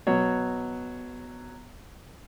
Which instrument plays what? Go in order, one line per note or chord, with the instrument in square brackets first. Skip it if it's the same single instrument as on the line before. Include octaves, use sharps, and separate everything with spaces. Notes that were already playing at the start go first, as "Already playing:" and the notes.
[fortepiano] B2 F#3 C#5